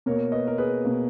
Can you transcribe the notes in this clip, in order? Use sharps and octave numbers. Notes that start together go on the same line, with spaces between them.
B2 A#3 A#4 C#5
B4 D#5
A#4
G#4 B4
B2 A#3